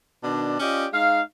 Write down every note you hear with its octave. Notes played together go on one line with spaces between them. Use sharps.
B2 D#3 D4
C#4 F4 G4 D5 D#5
G#3 D#4 F5